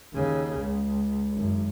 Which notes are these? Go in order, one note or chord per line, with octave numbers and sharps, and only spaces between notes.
D#2 C#3
C#2
G#1 F#2